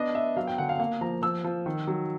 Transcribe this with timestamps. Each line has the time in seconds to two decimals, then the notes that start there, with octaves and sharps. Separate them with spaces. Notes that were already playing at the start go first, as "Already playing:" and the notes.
Already playing: B3 D4 D#5
0.15 B3 E5
0.36 F#3 F5
0.47 G5
0.58 D3 F#5
0.69 F5
0.79 A#3 F5
1.01 F3 A#5
1.22 F3 E6
1.44 F3
1.66 D#3
1.87 F#3